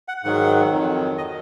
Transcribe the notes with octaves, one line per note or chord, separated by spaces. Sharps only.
F#5
G#2 D#3 F#3 F#5
F2 D#3 F#3
D#3 F#3 D#5